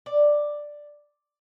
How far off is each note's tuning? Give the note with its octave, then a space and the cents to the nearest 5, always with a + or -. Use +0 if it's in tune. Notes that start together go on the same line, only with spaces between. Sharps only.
D5 +5